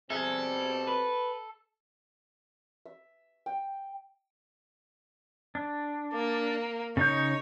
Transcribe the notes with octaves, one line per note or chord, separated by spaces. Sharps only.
B2 G3 C4 G#4 A4 E5
B4
E5
G5
D4
A#3
C#3 D#4 C#5 G6